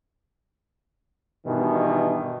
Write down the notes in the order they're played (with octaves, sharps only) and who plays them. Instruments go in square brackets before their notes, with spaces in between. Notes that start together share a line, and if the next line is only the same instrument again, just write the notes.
[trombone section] G2 B2 D#3 E3